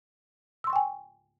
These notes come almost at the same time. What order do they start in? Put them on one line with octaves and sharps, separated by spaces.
E6 C6 C#6 G5 G#5